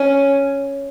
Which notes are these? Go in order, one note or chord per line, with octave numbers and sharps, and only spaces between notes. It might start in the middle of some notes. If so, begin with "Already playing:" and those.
Already playing: C#4